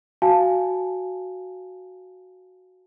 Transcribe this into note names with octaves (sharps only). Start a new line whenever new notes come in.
F#4 F5 G#5 A5